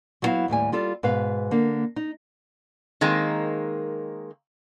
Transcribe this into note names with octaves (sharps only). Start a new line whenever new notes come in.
F#3 G3 B3 E4 F#4 F5
D#2 A2 G3 G#5
G3 F4 A4
G#2 B2 B4 F5
D3 A#3
D#4
D#3 G#3 A#3 C4